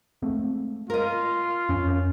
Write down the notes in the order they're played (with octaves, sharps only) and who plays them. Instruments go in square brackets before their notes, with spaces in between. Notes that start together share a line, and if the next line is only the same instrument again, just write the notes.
[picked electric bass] G#3 A3 C4
[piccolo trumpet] F4 [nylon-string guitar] A#4 D#5
[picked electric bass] F2 [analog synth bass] C#4